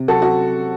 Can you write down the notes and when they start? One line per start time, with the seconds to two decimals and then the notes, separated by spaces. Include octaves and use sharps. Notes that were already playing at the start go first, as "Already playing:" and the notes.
Already playing: C3
0.08 F#3 F#4 A4
0.13 C4
0.22 F#4